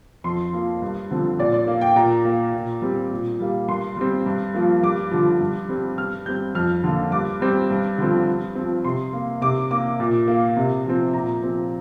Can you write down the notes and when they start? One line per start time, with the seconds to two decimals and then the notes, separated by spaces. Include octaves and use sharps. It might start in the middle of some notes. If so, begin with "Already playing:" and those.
0.24 F2 C6
0.53 F3 A#3
0.82 G2
1.11 D3 F3 C4
1.39 A#2 D5
1.54 D5
1.67 A#3
1.81 G5
1.96 A#2 A#5
2.25 A#3
2.54 A#2
2.82 G3 C4
3.11 A#2
3.40 G3 A#3
3.68 G2 C6
3.97 G3 C4
4.26 G2
4.54 F3 A#3
4.83 G2 D6
5.11 D3 F3
5.41 G2
5.69 G3 C4
5.98 G2 F6
6.26 G3 C4 G6
6.55 F2 F6
6.83 D3 A#3
7.12 G2 D6
7.41 G3 C4
7.71 G2
7.98 D3 F3 C4
8.28 G2
8.55 F3 C4
8.84 C3 C6
9.13 A#3
9.41 C3 D6
9.71 A#3 D6
10.00 A#2
10.28 A#3
10.56 C3
10.85 F3 C4
11.13 A#2 A#5
11.43 F3 C4